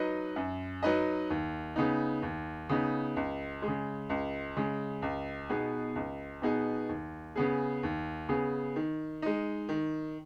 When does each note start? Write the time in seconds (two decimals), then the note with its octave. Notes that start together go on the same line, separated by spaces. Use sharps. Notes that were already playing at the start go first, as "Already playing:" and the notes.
Already playing: F#3 D#4 B4 D#5
0.36 F#2
0.83 F#3 D#4 B4 D#5
1.30 D#2
1.76 C#3 B3 D#4
2.22 D#2
2.69 C#3 B3 D#4
3.16 C#2
3.62 G#3
3.68 C#3
4.10 C#2
4.57 C#3 G#3
5.02 C#2
5.50 B2 B3 D#4 G#4
5.96 C#2
6.42 B2 B3 D#4 G#4
6.89 D#2
7.36 C#3 B3 G#4
7.83 D#2
8.29 C#3 B3 G#4
8.76 D#3
9.22 G#3 D#4
9.69 D#3